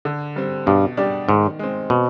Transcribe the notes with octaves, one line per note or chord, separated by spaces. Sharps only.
D3
G3 C4
G2 B2
G3 D4 G4 D5
G#2 D#3
G#3 C4
B2 C4